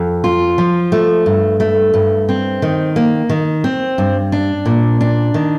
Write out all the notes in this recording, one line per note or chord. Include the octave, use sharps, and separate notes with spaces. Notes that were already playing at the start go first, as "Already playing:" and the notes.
Already playing: F2
F4
F3
A3
G2
A3
G2
C4
D#3
A#3
D#3
C4
G2
D4
A#2
D4
D#3